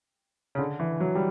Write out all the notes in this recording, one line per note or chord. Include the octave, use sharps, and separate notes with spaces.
C#3
D3
E3
F#3
G3